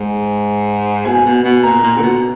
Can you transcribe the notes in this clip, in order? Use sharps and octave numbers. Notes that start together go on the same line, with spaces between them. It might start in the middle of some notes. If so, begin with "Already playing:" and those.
Already playing: G#2
B2 G#5
B2
B2
A#2 A#5
A#2
D3
B2